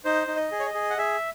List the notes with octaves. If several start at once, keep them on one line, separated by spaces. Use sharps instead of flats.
D#4 C5
D#4
D#5
G#4
C#5
D#5
G#4
F#5
G#4 E5